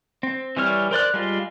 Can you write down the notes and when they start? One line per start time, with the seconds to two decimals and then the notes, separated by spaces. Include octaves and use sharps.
0.23 C4
0.57 E3 G3 C#5 F6
0.91 A#4 C5 D5 F#6
1.14 G3 G#3 F4